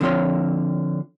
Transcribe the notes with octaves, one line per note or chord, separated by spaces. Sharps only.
D3 F3 C4 F4 C#5 C6